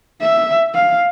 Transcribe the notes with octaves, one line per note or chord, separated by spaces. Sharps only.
E5
F5